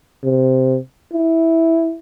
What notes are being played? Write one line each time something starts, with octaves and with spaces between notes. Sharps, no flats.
C3
E4